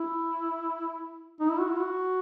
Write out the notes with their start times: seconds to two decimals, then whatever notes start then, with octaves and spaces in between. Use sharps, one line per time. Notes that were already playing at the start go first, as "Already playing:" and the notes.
Already playing: E4
1.40 D#4
1.50 E4
1.59 F#4
1.69 E4
1.79 F#4